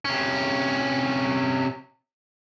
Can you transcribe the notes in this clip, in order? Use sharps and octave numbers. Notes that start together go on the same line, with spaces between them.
C3 C#4